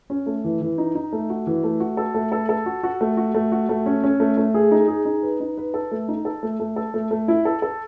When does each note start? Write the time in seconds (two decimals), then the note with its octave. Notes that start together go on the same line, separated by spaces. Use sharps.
0.10 C#4
0.26 A3
0.44 E3
0.61 E3
0.78 D#4
0.95 D#4
1.13 A3
1.30 F#4
1.47 E3
1.64 A3
1.80 F#4
1.97 A4
2.15 A3
2.32 A4
2.49 A4
2.66 F#4
2.83 F#4
3.01 A3
3.17 F#4
3.35 A3
3.52 F#4
3.69 A3
3.86 C#4
4.04 C#4
4.20 A3
4.37 A3
4.54 G#4
4.71 D#4
4.88 G#4
5.05 D#4
5.23 B4
5.40 D#4
5.58 B4
5.74 A4
5.91 A3
6.08 D#4
6.25 A4
6.43 A3
6.60 A3
6.76 A4
6.94 A3
7.11 A3
7.28 E4
7.45 A4
7.62 A4